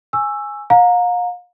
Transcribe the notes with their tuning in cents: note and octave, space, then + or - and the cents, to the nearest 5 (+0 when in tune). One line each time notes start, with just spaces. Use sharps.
G#5 +0 C#6 +0 E6 +5
F5 +35 A#5 +0